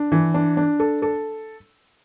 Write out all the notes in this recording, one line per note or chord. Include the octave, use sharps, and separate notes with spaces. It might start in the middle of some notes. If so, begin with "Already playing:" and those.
Already playing: D4
E3
D4
D4
A4
A4